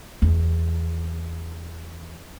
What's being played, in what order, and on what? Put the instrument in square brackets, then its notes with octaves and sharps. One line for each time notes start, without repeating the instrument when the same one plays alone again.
[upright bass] E2 E3